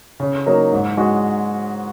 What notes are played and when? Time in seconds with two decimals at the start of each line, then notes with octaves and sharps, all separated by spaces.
0.20 C#3
0.46 F#3 A#3 D#4
0.72 G#2
0.97 G#3 F#4